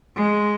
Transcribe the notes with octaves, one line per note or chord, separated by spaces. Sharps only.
G#3